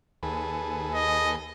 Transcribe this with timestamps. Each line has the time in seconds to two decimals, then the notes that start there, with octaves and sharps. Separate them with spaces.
0.23 D#2 G#4 A4 B4
0.94 D#5